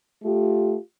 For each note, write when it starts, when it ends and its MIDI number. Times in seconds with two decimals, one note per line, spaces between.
0.24 0.77 57
0.24 0.77 65
0.24 0.77 67